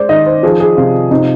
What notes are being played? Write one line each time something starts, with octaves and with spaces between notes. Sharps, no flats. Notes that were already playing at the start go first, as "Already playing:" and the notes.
Already playing: G#3 C5 D5
D#3 D#5
C5
F3 G#4
G#4
C3 F4
C3 D#4